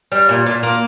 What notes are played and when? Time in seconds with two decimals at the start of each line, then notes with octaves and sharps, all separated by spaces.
0.12 G3
0.29 A#2
0.46 A#2
0.63 A#3